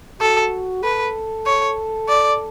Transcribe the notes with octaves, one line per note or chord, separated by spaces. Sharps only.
F#4 A4
A4 B4
C#5
D5